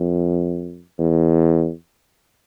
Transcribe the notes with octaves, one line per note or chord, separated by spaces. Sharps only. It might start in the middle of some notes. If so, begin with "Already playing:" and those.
Already playing: F2
E2